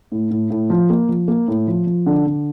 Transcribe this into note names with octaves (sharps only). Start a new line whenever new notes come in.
A2
A2
A2
F3
A#3
F3
A#3
A2
F3
F3
D3
D3